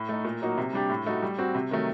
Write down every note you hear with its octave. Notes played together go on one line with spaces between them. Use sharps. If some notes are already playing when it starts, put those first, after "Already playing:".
Already playing: A2
A3 D#4
A#2
F#3 A#3 D#4 F#4
C3
G3 D4 G4
A2
A3 D#4 F#4
G3
C4 F#4
C3
D#3 F#3 A3